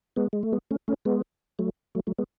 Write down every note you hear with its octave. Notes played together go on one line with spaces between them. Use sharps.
G#3 B3
G#3
A3
G#3 B3
A3 C#4
A3 C#4
G#3 B3
F#3 A3
F#3 A3
F#3 A3
G#3 B3